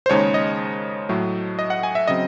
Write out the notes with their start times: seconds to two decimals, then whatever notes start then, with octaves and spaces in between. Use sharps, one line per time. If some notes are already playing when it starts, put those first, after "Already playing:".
0.06 C5
0.09 D#2 C#3 G#3 D#4 C#5
0.34 D#5
1.09 A2 F#3 A3
1.59 D#5
1.70 F#5
1.83 G#5
1.95 E5
2.08 C#3 F#3 C4 D#5